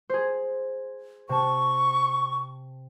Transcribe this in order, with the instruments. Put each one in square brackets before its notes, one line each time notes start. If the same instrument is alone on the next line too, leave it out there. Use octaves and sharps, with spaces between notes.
[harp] G#4 C5
[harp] C3 A5 [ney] C#6